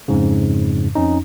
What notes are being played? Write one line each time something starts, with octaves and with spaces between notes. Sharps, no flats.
F2 G#2 C#3
F2 C#4 D#4